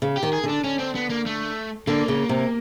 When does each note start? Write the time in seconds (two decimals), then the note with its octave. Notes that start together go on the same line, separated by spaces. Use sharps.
0.02 C#3
0.17 G4
0.23 D#3
0.33 G#4
0.43 D3
0.49 D4
0.64 D3 C#4
0.79 C4
0.95 B3
1.10 A#3
1.26 A3
1.87 D3 A#3
2.08 C#3
2.29 C3